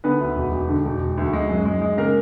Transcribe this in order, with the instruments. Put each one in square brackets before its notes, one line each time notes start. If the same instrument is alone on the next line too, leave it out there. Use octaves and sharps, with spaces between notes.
[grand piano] D3 B3 B4
D2
E1
E1
D3
E1
E1
D2
G#3
F#2
G#3
G#3
C#3 A#3 A#4